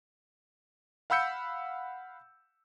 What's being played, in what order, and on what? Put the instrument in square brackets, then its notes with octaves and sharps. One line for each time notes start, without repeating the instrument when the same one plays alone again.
[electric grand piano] F5 F#5 B5 E6 G6 C#7